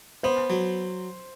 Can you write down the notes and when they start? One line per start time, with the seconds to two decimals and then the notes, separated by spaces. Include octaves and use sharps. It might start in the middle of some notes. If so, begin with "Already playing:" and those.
0.23 B3 C5
0.50 F#3